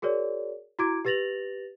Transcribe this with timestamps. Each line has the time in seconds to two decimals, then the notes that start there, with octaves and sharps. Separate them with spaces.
0.02 F#4 G#4 A#4 C#5 D5
0.79 E4 F#4 A#5 D6 G#6 D7
1.05 G4 B4 A6 A#6 F7 F#7